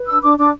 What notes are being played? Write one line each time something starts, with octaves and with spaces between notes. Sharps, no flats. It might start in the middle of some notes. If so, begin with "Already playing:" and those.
Already playing: B4
D4 E6
D4 D6
D4 D6